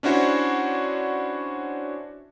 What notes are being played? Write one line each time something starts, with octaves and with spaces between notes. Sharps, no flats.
C#4 D4 E4 F#4 C5 C#5